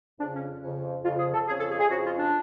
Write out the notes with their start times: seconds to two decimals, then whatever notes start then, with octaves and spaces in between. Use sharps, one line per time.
0.19 F2 C#3 D4
0.34 C#4
0.62 F2 C#3
1.04 F2 C#3 F4
1.19 G#4
1.34 A4
1.47 F2 G#4
1.50 C#3
1.58 A4
1.69 G#4
1.79 G#4
1.90 F2 C#3 F#4
2.05 F4
2.19 D4